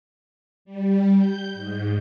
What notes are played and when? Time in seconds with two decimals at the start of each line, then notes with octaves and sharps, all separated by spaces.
0.65 G3
1.18 G6
1.54 G#2